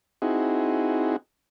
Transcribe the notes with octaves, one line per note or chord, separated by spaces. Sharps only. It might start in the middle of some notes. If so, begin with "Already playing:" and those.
C4 D#4 E4 F#4 G#4